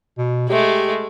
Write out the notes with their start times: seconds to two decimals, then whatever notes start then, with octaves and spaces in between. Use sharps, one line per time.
0.18 B2
0.50 G#3 A3 G4